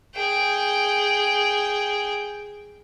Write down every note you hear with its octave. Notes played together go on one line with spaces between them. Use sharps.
G#4 G5